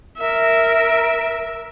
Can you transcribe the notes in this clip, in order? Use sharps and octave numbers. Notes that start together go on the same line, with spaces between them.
A#4 E5